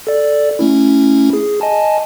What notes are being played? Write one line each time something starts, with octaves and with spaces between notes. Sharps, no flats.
A4 D5
A3 C#4 E4
G#4
D#5 G#5 A5